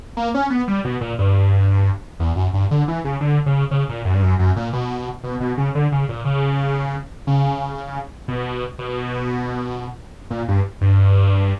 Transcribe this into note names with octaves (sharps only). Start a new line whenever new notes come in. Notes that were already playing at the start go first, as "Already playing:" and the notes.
A#3
C#4
B3
G3
B2
A#2
G2
E2
F#2
G2
D3
E3
C#3
D3
C#3
C#3
A#2
F#2
G2
F#2
F#2
A#2
B2
B2
B2
C#3
D3
C#3
A#2
C#3
C#3
B2
B2
A#2
G2
G2